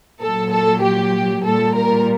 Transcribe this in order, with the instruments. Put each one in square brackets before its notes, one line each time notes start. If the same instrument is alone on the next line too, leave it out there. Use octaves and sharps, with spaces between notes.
[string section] A#2 F#3 A4
A4
G4
A#2 G3 A4
A#4